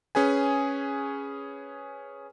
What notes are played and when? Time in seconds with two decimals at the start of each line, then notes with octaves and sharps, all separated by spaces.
0.15 C#4 G#4 B4 G#5